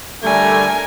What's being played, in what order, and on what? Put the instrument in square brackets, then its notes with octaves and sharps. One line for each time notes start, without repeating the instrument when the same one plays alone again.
[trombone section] D3 G3 A3 [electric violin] A#4 G#5